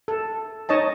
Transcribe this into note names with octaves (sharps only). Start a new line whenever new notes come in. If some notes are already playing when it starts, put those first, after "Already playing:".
A4
D#4 C#5 D#5 A5